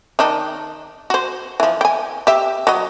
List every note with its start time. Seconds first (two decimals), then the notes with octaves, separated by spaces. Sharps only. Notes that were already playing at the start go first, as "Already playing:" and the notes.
0.19 D#3 D4 D#4
1.10 F#4 C5
1.60 E3 F3
1.81 G5 G#5
2.27 G4 E5
2.67 F#3 D#5